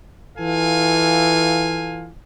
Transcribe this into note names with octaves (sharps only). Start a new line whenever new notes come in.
E3 F4 A4 F5 G#5